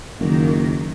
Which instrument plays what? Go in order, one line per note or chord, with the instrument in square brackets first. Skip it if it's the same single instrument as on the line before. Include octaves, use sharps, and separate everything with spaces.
[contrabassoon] F#1 [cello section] D#3 A#3